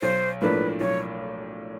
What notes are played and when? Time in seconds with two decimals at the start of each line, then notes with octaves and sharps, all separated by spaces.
0.02 B1 C5
0.41 A2 F3 A#3 D4 B4
0.80 B1 C#5